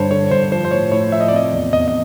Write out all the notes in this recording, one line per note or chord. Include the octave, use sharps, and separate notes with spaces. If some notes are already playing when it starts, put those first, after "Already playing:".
Already playing: G2 D3 C5 C#5
D3 C#5
G2 C5
F3 C5
C5
A2 C#5
A2 C#5
F3 E5
D#5
D5
C3 D#5
E2
E2 D#5
D#5